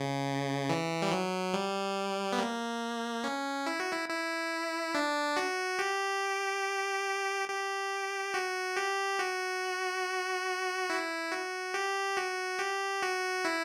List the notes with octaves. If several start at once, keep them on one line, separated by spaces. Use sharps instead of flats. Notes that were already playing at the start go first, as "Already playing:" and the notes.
Already playing: C#3
E3
G3
F#3
G3
B3
A#3
C#4
E4
F#4
E4
E4
D4
F#4
G4
G4
F#4
G4
F#4
E4
F#4
G4
F#4
G4
F#4
E4